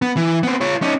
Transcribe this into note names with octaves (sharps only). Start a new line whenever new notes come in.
B3
E3
B3 C4
F4 C#5
C#4 D#4